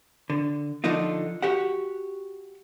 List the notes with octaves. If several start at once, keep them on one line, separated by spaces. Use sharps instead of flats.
D3
D3 F3 D4 D#4 F4
F#4 G4 F#5